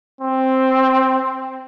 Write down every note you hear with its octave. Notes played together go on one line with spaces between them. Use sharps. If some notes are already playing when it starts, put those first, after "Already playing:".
C4